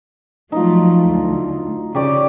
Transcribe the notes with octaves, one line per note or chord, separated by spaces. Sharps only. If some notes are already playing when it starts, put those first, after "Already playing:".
F3 F#3 A3 D#4 F4
D2
C#3 G4 C#5 D5